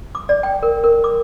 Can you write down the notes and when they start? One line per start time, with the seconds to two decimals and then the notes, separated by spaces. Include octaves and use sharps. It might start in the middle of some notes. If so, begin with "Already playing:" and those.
0.15 D6
0.29 D5
0.43 G5
0.63 A#4
0.84 A#4
1.04 D6